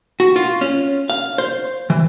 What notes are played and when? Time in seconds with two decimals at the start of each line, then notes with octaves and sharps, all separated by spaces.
0.20 F#4
0.36 F4
0.61 C#4
1.10 F5
1.38 C5
1.90 E3